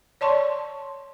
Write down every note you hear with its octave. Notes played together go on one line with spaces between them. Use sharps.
C#5 D5 A5 C6 C#6